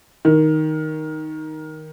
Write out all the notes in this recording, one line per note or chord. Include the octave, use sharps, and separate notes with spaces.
D#3